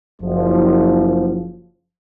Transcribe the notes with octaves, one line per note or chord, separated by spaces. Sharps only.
F#1 F3